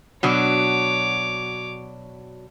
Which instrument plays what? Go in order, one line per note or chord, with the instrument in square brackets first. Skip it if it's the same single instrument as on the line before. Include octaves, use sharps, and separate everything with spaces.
[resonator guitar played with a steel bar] B2 F#3 D4 [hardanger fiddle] C#5 D6